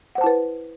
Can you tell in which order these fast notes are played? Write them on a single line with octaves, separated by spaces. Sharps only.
F#5 C5 A5 E4 B4